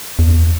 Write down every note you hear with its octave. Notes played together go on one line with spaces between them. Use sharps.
E2